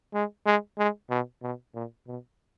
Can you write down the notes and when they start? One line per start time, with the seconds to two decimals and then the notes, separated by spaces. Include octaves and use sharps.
0.14 G#3
0.46 G#3
0.78 G#3
1.10 B2
1.43 B2
1.75 A#2
2.07 B2